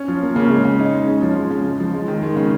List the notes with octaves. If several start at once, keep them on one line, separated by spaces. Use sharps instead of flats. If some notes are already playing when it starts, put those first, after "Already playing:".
Already playing: C#4
F3
A#3
C#3
G#3
C#3
D#4
G#3
C#4
F3
G#3
C#3
G#3
F3
G#3
D#3
G#3
C#3